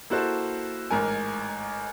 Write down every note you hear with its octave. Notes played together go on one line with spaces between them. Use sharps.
A#3 E4 F#4 A4 C5
A1 G#2 A#4 G#5